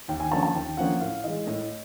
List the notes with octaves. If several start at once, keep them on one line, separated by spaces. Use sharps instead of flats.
D#2 G5
G#5
D3 F3 A#3 C#4 A5
A5
D#2 G5
D3 F3 A#3 C#4 F#5
A2 F5
E3 G#3 D#5
A2 D#5